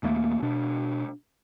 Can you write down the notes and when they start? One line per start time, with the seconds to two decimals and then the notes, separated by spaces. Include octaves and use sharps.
0.03 D#1 D#2 A3 A#3
0.42 B2 D4